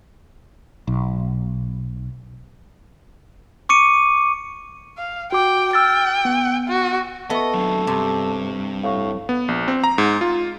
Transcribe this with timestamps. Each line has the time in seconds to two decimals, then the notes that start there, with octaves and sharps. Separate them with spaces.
0.87 B1
3.69 C#6 D6 C#7 D#7
4.98 F5
5.32 F#4 G5 D6
5.73 G5 E6 F6 A6
6.25 B3
6.68 F#4
7.30 B3 A4 D#5 E5 C#6
7.54 F#3 D4
7.87 G2 C3
8.83 A2 F5 C#6
9.29 B3
9.48 A#1
9.68 C4
9.84 A#5
9.98 G#2
10.21 F4